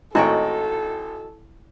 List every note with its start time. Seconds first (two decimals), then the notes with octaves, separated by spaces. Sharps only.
0.15 G#1 A2 E4 F#4 A4 D#5 G5 C#6